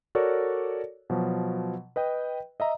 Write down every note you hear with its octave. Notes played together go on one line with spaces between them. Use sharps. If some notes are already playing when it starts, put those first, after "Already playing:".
F#4 A4 A#4 C#5 D5
B2 F3 F#3
B4 D#5 G5
D#5 E5 A#5